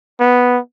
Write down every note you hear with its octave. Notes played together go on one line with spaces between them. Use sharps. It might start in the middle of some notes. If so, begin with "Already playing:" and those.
B3